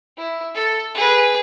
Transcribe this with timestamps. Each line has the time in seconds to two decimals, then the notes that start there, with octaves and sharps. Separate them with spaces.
0.18 E4
0.55 A4
0.95 G#4 B4